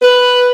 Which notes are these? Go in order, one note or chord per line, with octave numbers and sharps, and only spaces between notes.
B4